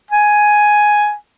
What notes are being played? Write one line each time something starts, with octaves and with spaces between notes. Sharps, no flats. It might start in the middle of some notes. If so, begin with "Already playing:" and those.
G#5